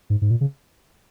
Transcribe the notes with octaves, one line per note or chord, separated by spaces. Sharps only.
G#2
G#2
A#2
C#3